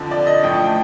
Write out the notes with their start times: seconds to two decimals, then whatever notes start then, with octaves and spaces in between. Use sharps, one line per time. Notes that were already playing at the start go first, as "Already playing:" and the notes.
Already playing: F2 D3 F3
0.11 D5
0.27 D#5
0.43 A1 A2 F3 G5
0.54 A5
0.64 G5